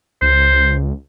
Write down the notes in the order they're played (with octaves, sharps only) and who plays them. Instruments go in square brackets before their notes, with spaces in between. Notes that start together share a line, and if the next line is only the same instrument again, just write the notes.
[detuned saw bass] C#2 [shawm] C5